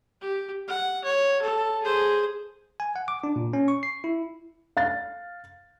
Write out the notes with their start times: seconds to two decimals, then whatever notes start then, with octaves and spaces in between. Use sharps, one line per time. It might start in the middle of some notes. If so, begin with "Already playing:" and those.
0.21 G4
0.68 F#5
1.04 C#5
1.42 A4
1.83 G#4 C5
2.80 G#5
2.96 F#5
3.08 D6
3.24 D4
3.36 A#2
3.53 C#4
3.68 C#6
3.83 C7
4.04 E4
4.77 F5 A6